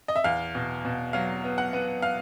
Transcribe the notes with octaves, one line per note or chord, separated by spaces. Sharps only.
D#5
E5
E2 F5
B2
B2
F#3 F5
B3
F#5
B3
F5